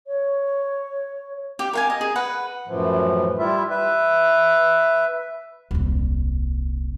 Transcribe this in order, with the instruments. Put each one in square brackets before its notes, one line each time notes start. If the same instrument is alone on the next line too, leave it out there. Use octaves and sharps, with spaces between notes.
[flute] C#5
[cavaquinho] G4 F5
A#4 F5 G#5
D#5
G#4
B4 F#5
[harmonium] F#2 A2 E3 F3
G3 E4 F4 E5
B4 E5
[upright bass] D#1 C2